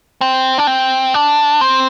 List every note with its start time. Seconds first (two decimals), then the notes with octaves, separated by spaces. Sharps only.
0.21 C4
0.58 D4
0.67 C4
1.14 D4
1.61 C4